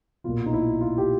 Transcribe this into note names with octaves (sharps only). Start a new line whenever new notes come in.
B1 A#2 F4
D#4
E4
F4
G4